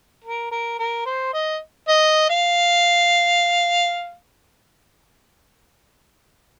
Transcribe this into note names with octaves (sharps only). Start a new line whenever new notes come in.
A#4
A#4
A#4
C5
D#5
D#5
F5